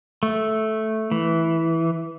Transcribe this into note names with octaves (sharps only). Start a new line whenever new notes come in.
A3
E3